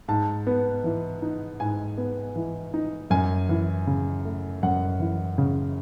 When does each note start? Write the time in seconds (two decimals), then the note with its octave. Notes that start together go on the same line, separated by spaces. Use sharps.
0.08 G#2 A5
0.47 B3
0.84 E3
1.22 D#4
1.60 G#2 G#5
1.98 B3
2.36 E3
2.74 D#4
3.10 F#2 G#5
3.49 E3
3.87 C#3
4.25 A3
4.63 F#2 F#5
5.00 E3
5.38 C#3